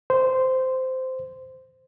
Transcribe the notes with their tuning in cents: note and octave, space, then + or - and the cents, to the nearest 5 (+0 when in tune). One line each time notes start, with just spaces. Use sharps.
C5 -10